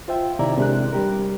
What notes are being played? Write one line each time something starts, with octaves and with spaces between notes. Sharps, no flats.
F4 C5 E5 G5
C3 D#3 E4 D5 E5 A#5
C3 G#3 D4 A#4 F#6
G3 G4 A#4